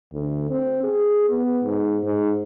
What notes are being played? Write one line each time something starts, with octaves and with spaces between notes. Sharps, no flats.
D2
C4
G#4
B3
G#2
G#2